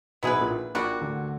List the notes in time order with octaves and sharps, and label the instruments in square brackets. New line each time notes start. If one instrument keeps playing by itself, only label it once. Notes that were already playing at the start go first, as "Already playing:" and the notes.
[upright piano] B1 B2 [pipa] B3 E4 G#4 B4
[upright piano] A#1 A#2
[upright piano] A#1 A#2 [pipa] G3 A#3 D4 F#4
[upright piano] D2 D3